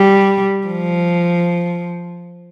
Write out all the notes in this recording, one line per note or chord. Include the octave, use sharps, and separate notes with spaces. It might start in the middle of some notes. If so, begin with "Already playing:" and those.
Already playing: G3
F3